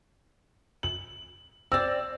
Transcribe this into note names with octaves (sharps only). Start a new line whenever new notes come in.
F#7
C4 D5 E6